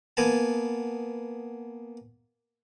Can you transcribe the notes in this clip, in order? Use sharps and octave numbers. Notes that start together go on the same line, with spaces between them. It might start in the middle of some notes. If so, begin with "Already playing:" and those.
A#3 B3 G#5 A5